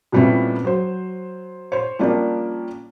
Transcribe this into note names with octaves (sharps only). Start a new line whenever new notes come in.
F2 A#2 G3 B3 C#4 E4
F#3 C5
C5 C#5
F3 G3 A#3 C#4 D4